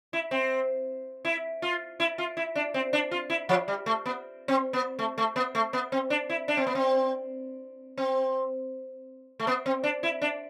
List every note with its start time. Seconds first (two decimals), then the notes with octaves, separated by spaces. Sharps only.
0.13 E4
0.31 C4
1.25 E4
1.62 F4
2.00 E4
2.18 F4
2.37 E4
2.56 D4
2.74 C4
2.93 D4
3.11 F4
3.30 E4
3.49 F3
3.68 G3
3.86 A3
4.06 B3
4.48 C4
4.73 B3
4.99 A3
5.18 A3
5.36 B3
5.55 A3
5.73 B3
5.92 C4
6.10 D4
6.30 E4
6.48 D4
6.57 C4
6.67 B3
6.75 C4
7.98 C4
9.40 A3
9.47 B3
9.66 C4
9.84 D4
10.03 E4
10.22 D4